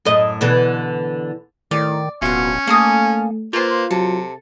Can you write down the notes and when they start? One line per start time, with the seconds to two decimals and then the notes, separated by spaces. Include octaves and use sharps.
0.05 F#2 A2 D#5
0.41 B2 D3 E3
1.71 A2 D#3 D5
2.22 D1 B2 C#4 F4 F#5
2.67 A3 A#3 A4 G#5 D#6
3.53 A#3 F4 B4 C5
3.91 C3 F#3 A4